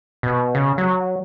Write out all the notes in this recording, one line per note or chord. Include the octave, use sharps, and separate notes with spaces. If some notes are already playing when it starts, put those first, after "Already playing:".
B2
C#3
F#3